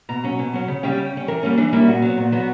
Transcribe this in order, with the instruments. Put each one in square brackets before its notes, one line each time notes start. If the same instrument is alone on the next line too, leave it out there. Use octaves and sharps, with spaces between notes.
[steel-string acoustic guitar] B2 A#5
F#3 C#4
B2
F#3 C#4
C#3
G3 C#4 G5
C#3
G3 C#4
E3 A#4
G3 A#3 C#4
E3 D4
G3 A#3 C#4 E4
A#2 F#4
F#3 B3
A#2
F#3 B3